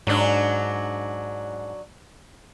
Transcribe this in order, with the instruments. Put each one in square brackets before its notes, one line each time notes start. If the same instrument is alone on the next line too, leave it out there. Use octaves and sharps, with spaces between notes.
[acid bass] G#2 [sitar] F#3 D4